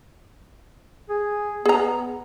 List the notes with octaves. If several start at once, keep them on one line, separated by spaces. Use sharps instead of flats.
G#4
B3 G#4 A#5